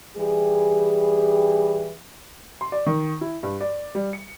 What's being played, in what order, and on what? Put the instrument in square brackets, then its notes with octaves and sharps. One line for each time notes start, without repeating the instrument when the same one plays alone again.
[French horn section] E3 G3 G4 G#4
[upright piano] C6
D5
D#3
E4
G2
D5
G3
C#7